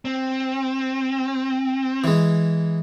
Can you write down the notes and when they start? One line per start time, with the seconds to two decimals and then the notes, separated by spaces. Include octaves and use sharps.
0.05 C4
2.04 E3 G#3